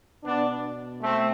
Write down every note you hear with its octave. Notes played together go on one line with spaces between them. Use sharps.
B2 B3 D4
A3 C4